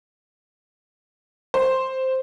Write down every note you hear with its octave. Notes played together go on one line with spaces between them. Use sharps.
C5